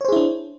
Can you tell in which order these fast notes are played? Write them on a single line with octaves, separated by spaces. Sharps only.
C#5 C5 G#4 E4 D4